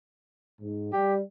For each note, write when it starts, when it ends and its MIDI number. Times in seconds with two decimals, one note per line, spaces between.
0.61 0.91 44
0.93 1.21 55
0.93 1.15 67